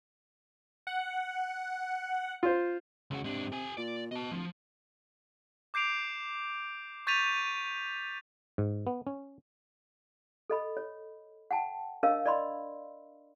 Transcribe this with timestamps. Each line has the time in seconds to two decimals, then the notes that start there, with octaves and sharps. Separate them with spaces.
0.87 F#5
2.43 F4 C5
3.11 C#2 C#3 F#4
3.24 G#2 C3 D4
3.52 G4 G#5
3.77 A#2 D5
4.11 B2 D#5 A5
4.32 D1 F3
5.74 D6 G6 C7 D7 F7
7.07 C#6 G6 A6 B6 D#7 F7
8.58 G#2
8.87 B3
9.07 C#4
10.50 A4 D#5 B5
10.77 C#5
11.51 F#5 G5 A5
12.03 D4 A#4 C#5 D#5 F5 E6
12.26 D5 D#5 B5 C6